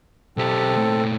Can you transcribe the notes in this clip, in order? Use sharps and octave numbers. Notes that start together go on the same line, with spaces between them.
B1 C4 G4 A4
A#2 A3